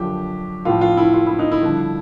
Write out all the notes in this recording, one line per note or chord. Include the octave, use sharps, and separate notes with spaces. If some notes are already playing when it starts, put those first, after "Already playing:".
Already playing: F#2 D3 F3 G4
A2 F3 F4
F4
E4
F4
E4
D#4
E4
G2 D3 F3